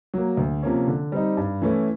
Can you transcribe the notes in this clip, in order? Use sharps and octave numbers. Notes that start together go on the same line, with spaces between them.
F#3 A#3
D2
C3 F3 A#3 C#4
D3
G3 C4 D#4
G2
E3 A3 C#4 E4